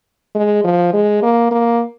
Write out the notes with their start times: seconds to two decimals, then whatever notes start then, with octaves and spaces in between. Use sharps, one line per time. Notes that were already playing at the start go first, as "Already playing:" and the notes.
0.35 G#3
0.64 F3
0.93 G#3
1.22 A#3
1.51 A#3